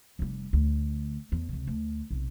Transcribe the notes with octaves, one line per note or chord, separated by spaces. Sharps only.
F1 G3
D2
E2
C#2 C3
D2
B1 C3